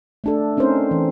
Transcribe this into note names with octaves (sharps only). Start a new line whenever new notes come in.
A3 D4 A4
C4 C#4 D#4 A#4 C5 C#5
E3